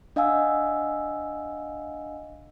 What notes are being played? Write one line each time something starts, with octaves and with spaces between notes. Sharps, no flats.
D4 D#5 F5 F#5 G#5 E6